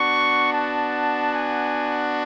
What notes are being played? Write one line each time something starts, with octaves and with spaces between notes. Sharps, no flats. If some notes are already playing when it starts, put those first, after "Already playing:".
Already playing: B3 D4 F#4 C#6
A5
G#5